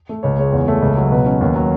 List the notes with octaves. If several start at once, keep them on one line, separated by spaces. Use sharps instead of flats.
A3
C#2 C#5
G#3 C#5
E2
A3
C#2
F#3
B2 B4
C#4
D#2
F#3